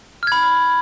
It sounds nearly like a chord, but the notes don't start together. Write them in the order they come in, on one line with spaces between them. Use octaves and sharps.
F6 G#6 B5